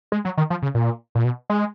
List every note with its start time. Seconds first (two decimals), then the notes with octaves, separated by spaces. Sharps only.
0.12 G#3
0.25 F#3
0.37 D#3
0.50 F3
0.62 C#3
0.75 A#2
1.15 A#2
1.25 B2
1.50 G#3